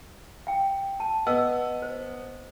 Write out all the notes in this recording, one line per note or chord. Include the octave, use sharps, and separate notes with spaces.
F5 G5
A5
B3 D#5 E6
C5